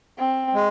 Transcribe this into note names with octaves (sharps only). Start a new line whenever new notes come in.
C4
G#3